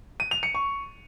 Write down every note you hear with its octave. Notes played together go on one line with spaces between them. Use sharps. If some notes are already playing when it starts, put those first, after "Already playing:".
D#7
F7
C#7
C#6